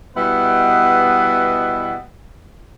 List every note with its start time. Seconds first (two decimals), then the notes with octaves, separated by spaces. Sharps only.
0.17 B2 G3 B3 E4 B4 D#5